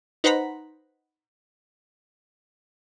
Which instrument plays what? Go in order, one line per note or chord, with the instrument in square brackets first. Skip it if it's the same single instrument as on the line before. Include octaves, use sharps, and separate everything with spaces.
[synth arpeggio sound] D#4 B4 C5 F#5 A#5 B5